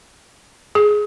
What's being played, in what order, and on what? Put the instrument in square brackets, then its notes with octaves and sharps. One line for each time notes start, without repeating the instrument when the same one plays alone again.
[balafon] G#4